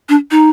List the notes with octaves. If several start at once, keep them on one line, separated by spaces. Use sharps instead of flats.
D4
D#4